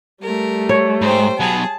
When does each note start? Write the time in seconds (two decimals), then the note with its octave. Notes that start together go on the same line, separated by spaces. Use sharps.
0.22 G3 A3 A#4
0.69 C#5
1.01 G#2 C5 G5
1.40 F#3 B3 G#4 A5